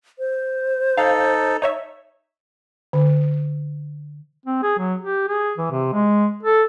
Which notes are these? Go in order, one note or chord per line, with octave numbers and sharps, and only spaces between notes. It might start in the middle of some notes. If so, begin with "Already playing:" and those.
C5
D#4 A4 F5
D#4 C#5 E5
D3
C4
G#4
F#3
G4
G#4
E3
C3
G#3
A4